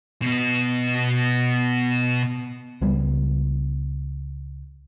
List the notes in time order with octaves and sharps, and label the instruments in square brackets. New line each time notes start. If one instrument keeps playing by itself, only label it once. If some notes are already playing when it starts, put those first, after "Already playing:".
[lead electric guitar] B2 B3
[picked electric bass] C#2 F3 G3 B3